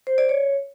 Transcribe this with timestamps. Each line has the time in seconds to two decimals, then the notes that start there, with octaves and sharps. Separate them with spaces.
0.07 C5
0.18 D5
0.29 C#5